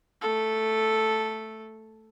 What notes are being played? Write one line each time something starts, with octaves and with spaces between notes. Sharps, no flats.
A3 A4